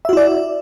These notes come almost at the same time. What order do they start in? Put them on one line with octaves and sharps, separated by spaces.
E5 F#4 E4 D5